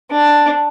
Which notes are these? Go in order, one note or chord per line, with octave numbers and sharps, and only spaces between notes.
D4